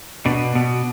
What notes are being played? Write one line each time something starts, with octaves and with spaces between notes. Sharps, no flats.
B2 D4
B2